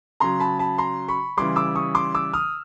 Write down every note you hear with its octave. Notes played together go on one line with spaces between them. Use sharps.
C#3 F#3 A#5 C6
A5 B5
A5 B5
A#5 C6
B5 C#6
C#3 E3 G3 C6 D6
D6 E6
C#6 D#6
C6 D6
D6 E6
D#6 F6